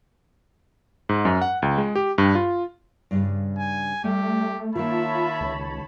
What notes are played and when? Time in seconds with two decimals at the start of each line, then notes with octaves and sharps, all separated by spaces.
1.09 G#2
1.25 F#2
1.41 F#5
1.62 C#2
1.78 G#3
1.96 G4
2.18 G2
2.35 F4
3.11 G2 C#3 G3
3.58 G#5
4.04 G3 A3 G4
4.76 D#3 A#3 F4 C#5 E5 A5 B5
5.41 C#2